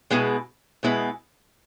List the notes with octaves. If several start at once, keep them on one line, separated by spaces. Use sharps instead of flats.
B2 G#3 B3 E4 G#4
B2 G#3 B3 E4 G#4